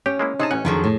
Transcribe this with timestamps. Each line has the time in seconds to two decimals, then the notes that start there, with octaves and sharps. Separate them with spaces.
0.06 C#4 G4 C#5
0.19 G#3 A#3 E4
0.40 C3 D#4 G#4 A5
0.51 A1 C#4 F#5
0.65 F2 D3 D#3 F3 F#3 G#4
0.84 A2